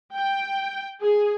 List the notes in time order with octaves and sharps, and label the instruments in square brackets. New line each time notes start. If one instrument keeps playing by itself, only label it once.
[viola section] G5
G#4